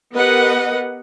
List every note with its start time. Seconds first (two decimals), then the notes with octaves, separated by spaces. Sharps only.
0.15 B3 G4 A#4 B4 D#5 F#5